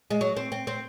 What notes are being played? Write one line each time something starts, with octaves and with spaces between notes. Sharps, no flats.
G#3
F#3
C4
C4
C4